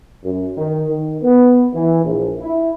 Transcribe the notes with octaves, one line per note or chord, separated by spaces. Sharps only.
F#2
D#3
D#3
B3
E3
A#1
E4